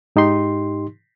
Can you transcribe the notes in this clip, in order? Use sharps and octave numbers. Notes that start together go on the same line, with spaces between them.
G#2 D#4 G4 C6